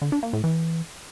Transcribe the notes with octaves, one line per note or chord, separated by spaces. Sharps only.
D3
D4
A#3
A2
E3